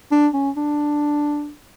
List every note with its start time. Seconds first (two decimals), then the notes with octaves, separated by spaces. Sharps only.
0.11 D4
0.34 C#4
0.56 D4